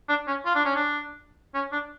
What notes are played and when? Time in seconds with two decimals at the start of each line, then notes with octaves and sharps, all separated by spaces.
0.09 D4
0.28 C#4
0.46 F4
0.55 D4
0.65 C#4
0.76 D4
1.55 C#4
1.72 D4